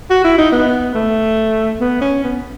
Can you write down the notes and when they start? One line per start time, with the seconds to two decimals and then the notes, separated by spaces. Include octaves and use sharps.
0.10 F#4
0.24 E4
0.38 D#4
0.52 B3
0.94 A3
1.81 B3
2.01 C#4
2.24 B3